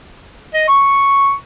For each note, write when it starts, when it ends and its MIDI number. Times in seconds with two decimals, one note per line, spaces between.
0.54 0.67 75
0.68 1.33 85